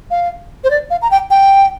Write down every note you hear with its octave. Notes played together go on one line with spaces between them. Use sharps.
F5
C5
D5
F5
A#5
G5
G5